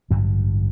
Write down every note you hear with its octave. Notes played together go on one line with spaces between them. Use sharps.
A1 G2 D3 F#3